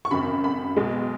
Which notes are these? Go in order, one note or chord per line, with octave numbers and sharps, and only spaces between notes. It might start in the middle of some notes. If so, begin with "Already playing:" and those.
C#6
G#1 F#2 C#3 B5
B5
B1 B2 G#3